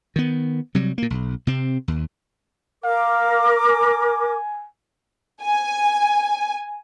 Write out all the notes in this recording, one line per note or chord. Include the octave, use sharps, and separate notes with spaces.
D#3 B3
C3 F#3 G3
A#2 A#3
B1
C3 C4
D#2
A#4 F5 D6
G#5
G#5